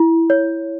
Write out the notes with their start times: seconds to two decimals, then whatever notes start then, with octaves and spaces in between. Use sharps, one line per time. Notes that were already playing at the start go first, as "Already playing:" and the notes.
Already playing: E4
0.30 C#5